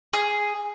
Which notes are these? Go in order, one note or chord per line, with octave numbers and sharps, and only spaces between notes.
G#4